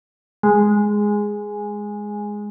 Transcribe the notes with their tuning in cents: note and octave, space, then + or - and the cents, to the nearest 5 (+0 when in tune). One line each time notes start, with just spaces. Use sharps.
G#3 +0